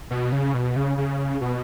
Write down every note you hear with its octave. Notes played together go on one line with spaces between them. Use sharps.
B2
C#3
B2
C#3
C#3
B2